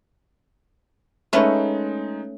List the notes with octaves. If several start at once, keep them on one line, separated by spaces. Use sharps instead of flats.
G#3 A3 C#4 D#4 B4